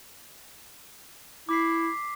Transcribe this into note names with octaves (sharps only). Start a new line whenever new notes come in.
E4 D6 B6 C7